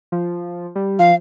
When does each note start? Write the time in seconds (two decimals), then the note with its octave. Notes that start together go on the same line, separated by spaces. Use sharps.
0.12 F3
0.75 G3
0.99 F3 F5